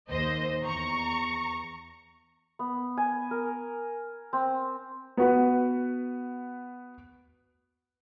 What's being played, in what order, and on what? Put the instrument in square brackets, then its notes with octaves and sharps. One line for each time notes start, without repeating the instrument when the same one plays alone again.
[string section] D#2 C5 D#5
E2 A#5 C#6
[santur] B3
G#5
A#4
C4
[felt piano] B3 F#4 B4